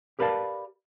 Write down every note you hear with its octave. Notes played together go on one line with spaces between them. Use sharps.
G4 A#4 B4 D5 F5 A5